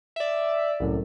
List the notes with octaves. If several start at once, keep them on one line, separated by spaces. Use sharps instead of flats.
D5 E5
C2 F#2 A2